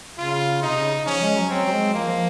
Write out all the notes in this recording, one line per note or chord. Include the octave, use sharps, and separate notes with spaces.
C#3 F4
C3 D#4
C#3
F3 C#4
G#3
F#3
F#3 C4
F#3
G#3
F3 A#3
F3